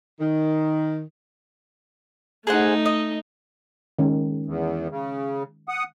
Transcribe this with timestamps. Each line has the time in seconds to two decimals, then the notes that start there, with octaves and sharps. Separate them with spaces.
0.21 D#3
2.47 A3 D#4 G#4 C5 F#5
2.86 D#5
3.99 D#3 G#3 C#4
4.46 E2
4.90 C#3
5.69 F#5 D#6